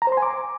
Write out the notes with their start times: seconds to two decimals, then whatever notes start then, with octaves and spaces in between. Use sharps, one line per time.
0.02 A#5
0.07 C5
0.12 C6
0.17 G#5
0.22 D6